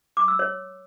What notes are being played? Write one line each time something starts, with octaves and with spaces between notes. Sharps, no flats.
D6
E6
C#5